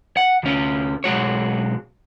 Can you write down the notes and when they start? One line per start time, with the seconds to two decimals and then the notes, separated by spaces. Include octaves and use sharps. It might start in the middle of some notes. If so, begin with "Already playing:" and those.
0.17 F#5
0.43 D2 C#4
1.04 B1 G#3 F#4 C#5